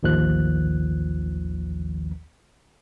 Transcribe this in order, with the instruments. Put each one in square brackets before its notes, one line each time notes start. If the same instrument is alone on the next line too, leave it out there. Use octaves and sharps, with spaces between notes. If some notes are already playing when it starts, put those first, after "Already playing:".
[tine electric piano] A1 D#2 D#3 F3 F#6